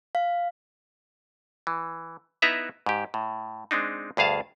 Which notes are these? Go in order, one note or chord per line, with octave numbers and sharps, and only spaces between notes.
F5
E3
B3 D#4 E4 B4 E5 A#5
G#2 G4
A2
G#3 C4 D4 D#4
D2 G2 G#4 F5 A5